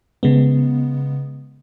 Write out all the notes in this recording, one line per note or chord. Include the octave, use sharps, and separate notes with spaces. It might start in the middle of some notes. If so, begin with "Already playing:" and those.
C#3 G#3 B3